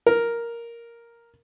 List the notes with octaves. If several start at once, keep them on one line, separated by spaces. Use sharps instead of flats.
A#4